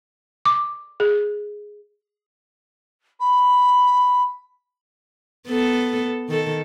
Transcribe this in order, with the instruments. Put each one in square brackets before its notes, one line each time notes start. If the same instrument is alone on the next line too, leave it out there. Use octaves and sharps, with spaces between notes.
[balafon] D6
G#4
[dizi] B5
[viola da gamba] B3 A4
D#3 A4